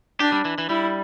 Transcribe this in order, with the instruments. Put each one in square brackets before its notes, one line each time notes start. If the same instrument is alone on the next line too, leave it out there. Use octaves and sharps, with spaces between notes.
[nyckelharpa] D4 [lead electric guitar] G4
[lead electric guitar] G3
E3
E3
[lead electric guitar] G3 [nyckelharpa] E4